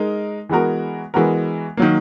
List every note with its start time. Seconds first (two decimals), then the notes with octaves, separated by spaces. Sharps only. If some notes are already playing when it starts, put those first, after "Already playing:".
Already playing: G#3 D#4 A#4
0.49 E3 G#3 B3 F#4 A#4
1.14 E3 G#3 B3 F#4 A#4
1.77 D#3 F#3 A#3